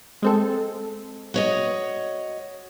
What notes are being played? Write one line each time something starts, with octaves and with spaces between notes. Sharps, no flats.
G#3 C4 A4
F#4 C#5 D#5